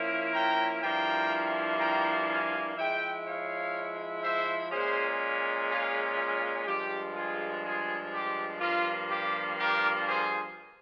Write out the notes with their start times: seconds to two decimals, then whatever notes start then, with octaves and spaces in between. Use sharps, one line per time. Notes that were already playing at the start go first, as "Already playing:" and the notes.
Already playing: F3 A#3 C#4 E4
0.34 G5 A#5
0.82 G2 F3 A#3 E4 G5 A#5
1.81 G5 A#5
2.29 F5 G#5
2.77 F3 G#3 E4 E5 G5
3.26 C#5 F5
4.23 C5 E5
4.72 A#2 G#3 C#4 G#4 C5
5.69 F4 G#4
6.17 F4
6.66 G2 F3 G#3 G4
7.15 F4 G#4
7.63 F4 G#4
8.12 G4
8.61 G2 F3 A#3 F4
9.09 G4
9.58 G4 A#4
10.07 G#4 C5